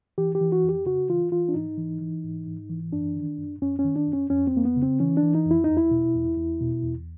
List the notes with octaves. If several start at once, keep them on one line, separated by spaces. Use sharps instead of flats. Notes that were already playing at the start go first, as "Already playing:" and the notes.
E3 G4
G4
E3
F#4
F2
G4
C#3 F#4
E3 F4
E3 F4
D4
G#2 D#4
E3
E3
G#2
G#2
E3
F#2 D4
D#3
F#2
F#2 C#4
C#4
D#3
D4
F#2
C#4
F2 C#4
C4
F2 A#3
B3
C#3
C4
E3 C#4
D4
E3
D#4
F2
E4
E2 D#4
E4
B2
E2
E2
B2
E2